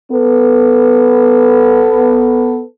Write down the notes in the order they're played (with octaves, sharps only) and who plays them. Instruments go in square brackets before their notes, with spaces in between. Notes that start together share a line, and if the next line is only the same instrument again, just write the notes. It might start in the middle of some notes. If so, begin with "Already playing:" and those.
[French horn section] B3 A4